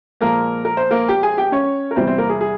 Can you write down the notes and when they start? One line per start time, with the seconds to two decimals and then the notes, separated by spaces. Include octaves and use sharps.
0.21 A#2 F3 G#3 A#3 A#4
0.65 A#4
0.77 C5
0.91 A#3 A#4
1.09 G4 G5
1.23 G#4 G#5
1.37 G4 G5
1.52 C#4 C#5
1.91 A#4
1.96 E2 C3 G3 C4 E4 C5
2.07 C4 C5
2.18 A#3 A#4
2.29 G#4
2.41 G#4